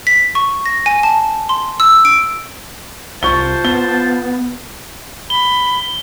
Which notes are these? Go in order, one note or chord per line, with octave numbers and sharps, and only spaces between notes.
B6
C#6
A#6
G#5
A5
C6
E6
D7
C2 F4 C5 A5 C#6 G7
B3 G7
B5 G7